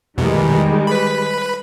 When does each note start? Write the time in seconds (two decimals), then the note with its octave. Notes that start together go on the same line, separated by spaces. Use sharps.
0.18 E2 B2 D#3 G3 G#3
0.87 B4 B5